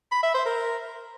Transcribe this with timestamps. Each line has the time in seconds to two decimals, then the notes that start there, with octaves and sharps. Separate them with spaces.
0.11 B5
0.23 E5
0.34 C5
0.45 A#4